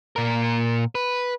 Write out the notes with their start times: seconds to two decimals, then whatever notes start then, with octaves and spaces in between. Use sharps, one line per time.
0.16 A#2 A#4
0.95 B4